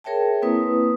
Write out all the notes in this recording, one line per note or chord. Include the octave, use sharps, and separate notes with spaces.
G#4 A#4 C#5 E5 G5 A5
A#3 C4 E4 B4 D#6